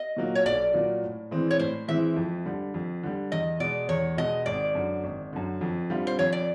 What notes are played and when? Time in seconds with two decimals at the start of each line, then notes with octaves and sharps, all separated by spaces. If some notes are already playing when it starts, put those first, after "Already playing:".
Already playing: D#5
0.17 A#2 F#3 A#3
0.35 C#5
0.46 B1 D5
0.73 A#2 F#3 A#3
1.03 A2
1.31 E3 G#3 C4 E4
1.51 C#5
1.59 A2 C5
1.88 E3 G#3 C4 E4 E5
2.17 F2
2.46 D3 G3
2.74 F2
3.03 D3 G3
3.32 E2 D#5
3.60 B2 G#3 D5
3.89 E2 C#5
4.17 B2 G#3 D#5
4.46 G#1 D5
4.75 F#2 D3
5.04 G#1
5.33 F#2 D3
5.61 F2
5.90 D3 G3 C4 F4
6.07 C5
6.19 F2 C#5
6.32 D5